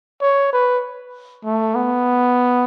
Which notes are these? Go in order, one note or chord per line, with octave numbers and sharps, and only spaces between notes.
C#5
B4
A3
B3